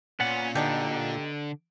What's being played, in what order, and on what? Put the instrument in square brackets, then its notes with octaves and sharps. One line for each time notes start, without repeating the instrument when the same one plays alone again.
[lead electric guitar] A#2 [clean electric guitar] B3 F#5 [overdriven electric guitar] C#4
[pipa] B2 D4 D#4 [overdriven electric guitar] D3 [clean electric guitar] G4